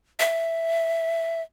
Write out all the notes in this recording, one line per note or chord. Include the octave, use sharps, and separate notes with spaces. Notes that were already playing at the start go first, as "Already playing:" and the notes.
E5